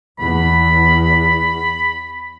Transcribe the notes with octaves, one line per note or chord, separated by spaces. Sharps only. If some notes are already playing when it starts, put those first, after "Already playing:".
E2 B5